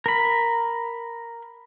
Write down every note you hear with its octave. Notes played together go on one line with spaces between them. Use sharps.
A#4 B5